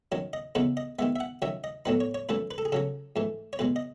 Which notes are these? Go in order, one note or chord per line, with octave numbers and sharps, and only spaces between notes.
D#3 F#3 C#4
D#5
E2 C#3 E3 B3 D#4 B4
D#5
D#3 G#3 B3 E5
E5
F#5
D#3 F#3 C#4 E5
D#5
A2 F#3 B3 D#4 B4
C#5
C#5
F#2 E3 A3 C#4 B4
B4
A4
G#4
C#3 F#3 C#4 A4
G#2 E3 A3
C#5
E2 B2 G#3 B4
D#5